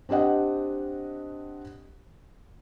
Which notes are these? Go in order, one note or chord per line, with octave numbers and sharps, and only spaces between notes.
C4 D4 G4 D#5 F#5